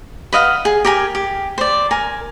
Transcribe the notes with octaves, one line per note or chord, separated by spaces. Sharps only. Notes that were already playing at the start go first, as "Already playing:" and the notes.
B4 D#5 F5 F#5
G#4
G4 A#4 G#5
G4
C5 D5
A#4 G#5